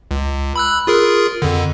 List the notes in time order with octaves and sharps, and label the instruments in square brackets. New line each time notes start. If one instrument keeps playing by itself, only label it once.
[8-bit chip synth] C#2
B5 E6 F#6
F4 G#4 A#4
F2 D3